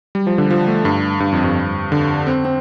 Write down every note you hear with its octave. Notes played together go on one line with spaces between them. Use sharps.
G3
F3
D3
F3
A3
G2
G2
F2
G2
D3
C4
C4